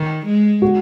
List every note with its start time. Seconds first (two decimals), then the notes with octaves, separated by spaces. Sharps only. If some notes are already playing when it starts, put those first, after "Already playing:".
Already playing: D#3
0.26 G#3
0.62 F#4